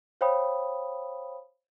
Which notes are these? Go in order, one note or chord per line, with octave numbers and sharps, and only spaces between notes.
C5 C#5 F5 G5 B5 D#6